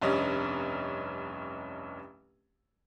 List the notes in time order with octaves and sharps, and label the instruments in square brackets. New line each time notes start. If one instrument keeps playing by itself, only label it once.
[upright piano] F1 C2 G2 C#4 D#5